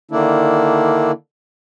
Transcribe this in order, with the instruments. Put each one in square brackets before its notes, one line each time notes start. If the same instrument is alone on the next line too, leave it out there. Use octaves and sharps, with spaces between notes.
[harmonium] D3 D#3 A#3 D4 E4